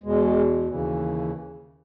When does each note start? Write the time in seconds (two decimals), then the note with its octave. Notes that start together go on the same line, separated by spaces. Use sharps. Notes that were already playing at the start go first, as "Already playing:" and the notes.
0.04 E2 B2 G#3
0.67 D#2 C#3 E3